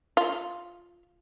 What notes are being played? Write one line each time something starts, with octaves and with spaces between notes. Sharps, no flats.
F4